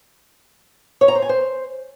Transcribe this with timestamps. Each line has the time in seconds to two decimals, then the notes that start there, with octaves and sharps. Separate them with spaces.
1.01 C#5
1.08 A#5
1.15 C5
1.22 G#5
1.29 C5